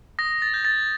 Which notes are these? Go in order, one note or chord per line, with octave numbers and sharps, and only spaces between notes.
D#6 A#6
A6
G6
A6